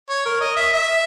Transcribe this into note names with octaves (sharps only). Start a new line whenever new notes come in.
C#5
A#4
D#5
E5
E5